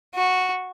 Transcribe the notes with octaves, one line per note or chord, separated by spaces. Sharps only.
F#4